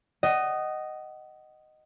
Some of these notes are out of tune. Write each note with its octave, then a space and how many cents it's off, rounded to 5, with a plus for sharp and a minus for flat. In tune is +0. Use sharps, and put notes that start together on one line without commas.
D#5 -5 F#5 +30